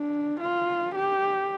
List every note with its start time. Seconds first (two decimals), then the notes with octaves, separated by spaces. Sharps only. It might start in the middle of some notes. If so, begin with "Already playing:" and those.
Already playing: D4
0.41 F4
0.96 G4